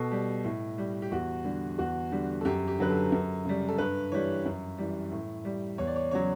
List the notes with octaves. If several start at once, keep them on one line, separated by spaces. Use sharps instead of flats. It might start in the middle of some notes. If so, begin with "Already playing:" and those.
Already playing: B2 A4
G3
A2
G3
G4
E2 F#4
D3 G3
E2 F#4
D3 G3
A4
F#2 G4
G4
D3 F#3 B4
A4
F#2
C#3 G3
A4
G2 B4
E3 G3 C#5
F#2
E3 G3
A2
G3
E2 C#5
D5
C#5
C#3 F#3 C#5